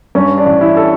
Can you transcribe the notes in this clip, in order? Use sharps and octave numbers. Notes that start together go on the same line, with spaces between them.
G2 C#4
D4
A1
E4
A4